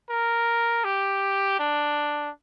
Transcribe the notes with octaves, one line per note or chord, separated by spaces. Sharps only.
A#4
G4
D4